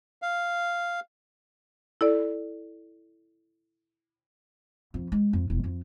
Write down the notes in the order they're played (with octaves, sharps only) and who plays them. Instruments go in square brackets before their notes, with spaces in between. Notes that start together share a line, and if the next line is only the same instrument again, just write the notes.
[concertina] F5
[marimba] E4 A4 D5
[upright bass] F2
G#3
F2
E1
F2